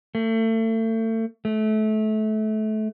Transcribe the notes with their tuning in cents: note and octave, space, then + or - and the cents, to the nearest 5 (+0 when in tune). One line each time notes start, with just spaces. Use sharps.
A3 +35
A3 -25